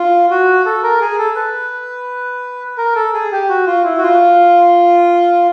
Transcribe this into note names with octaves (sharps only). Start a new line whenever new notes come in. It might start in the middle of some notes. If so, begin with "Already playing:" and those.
Already playing: F4
F#4
A4
A#4
G#4
A4
B4
A#4
A4
G#4
G4
F#4
F4
E4
F#4
F4